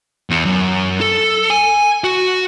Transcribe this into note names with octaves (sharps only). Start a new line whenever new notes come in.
E2
F#2
A4
G#5
F#4